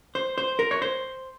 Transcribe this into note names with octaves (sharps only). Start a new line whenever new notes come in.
C5
C5
A#4
C#5
C5